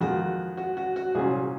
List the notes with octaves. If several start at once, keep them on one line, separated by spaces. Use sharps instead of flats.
F2 D#3 G#3 F#4
F#4
F#4
F#4
C2 A#2 F#3 C#4 G#4